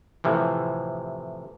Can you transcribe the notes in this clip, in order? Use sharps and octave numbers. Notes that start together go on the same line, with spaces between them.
A2 C3 E3 F3